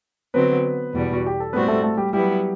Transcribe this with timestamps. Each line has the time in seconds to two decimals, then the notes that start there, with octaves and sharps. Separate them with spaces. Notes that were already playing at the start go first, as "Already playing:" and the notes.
0.34 D3 F#3 B3 C4 B4
0.94 E2 B2 G3
1.13 F#4
1.26 G4
1.40 A4
1.53 A2 G3 B3 C4 F#4 B4
1.68 A3 A4
1.83 A3 A4
1.97 G3 G4
2.13 F#3 G3 B3 E4 G4